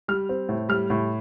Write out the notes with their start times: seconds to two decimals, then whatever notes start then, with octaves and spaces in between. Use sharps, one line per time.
0.08 G3 F6
0.29 C4
0.49 A2
0.69 G3 F6
0.90 A2